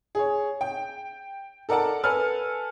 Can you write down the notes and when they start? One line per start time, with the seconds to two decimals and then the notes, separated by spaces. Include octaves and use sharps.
0.15 G#4 C#5
0.61 G5
1.69 A4 A#4 D5 F#5 A5
2.03 A4 B4 G#5 F6